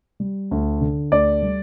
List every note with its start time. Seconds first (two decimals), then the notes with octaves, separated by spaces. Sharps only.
0.20 G3
0.51 D2
0.81 D3
1.12 D2 D5
1.42 G3